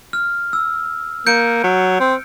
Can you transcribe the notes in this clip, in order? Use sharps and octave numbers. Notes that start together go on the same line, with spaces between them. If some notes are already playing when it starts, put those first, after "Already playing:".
F6
E6
A#3 G6 C#7 D7
F#3
C4